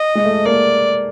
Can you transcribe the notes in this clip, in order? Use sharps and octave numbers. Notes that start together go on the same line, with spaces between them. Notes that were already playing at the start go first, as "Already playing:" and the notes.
Already playing: D#5
G#3
A3
A#3 D5